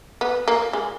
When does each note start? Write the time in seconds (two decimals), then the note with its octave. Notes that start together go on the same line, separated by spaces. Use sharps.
0.21 B3
0.48 A#3
0.73 G#3